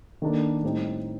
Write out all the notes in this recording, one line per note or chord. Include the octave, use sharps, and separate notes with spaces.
D#3 A#3 D4 A4
A2 G3 C4 D#4